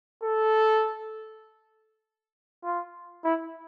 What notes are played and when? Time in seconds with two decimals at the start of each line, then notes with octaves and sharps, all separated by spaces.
0.23 A4
2.64 F4
3.24 E4